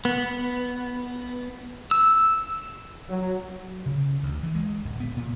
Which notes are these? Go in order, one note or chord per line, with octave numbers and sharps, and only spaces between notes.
B3
E6
F#3
C#3
D2
E3
G#3
D1
B3
A#2